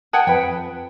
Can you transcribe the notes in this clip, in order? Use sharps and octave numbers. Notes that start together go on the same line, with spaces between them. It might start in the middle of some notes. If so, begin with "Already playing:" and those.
F#5 G5 A5 D#6 F#6 G#6
F2 B4 G5